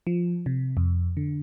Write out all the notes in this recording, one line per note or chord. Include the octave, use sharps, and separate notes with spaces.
F3
C3
F2
D3